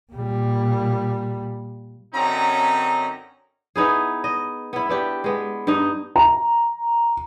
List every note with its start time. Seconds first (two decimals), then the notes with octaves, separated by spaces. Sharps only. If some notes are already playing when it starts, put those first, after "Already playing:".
0.13 A#2 G3
2.14 F#2 D3 C4 C#4 D#4 A#5
3.76 B3 D#4 E4 G#4
4.24 D#5
4.73 B3 E4
4.89 B3 D4 G4
5.24 G#3 B3
5.67 G2 D#4
6.16 A#5